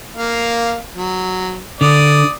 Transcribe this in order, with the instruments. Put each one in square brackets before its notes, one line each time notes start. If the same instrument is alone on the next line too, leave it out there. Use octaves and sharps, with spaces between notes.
[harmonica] A#3 F5
F#3
[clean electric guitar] D3 [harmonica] D5 D#6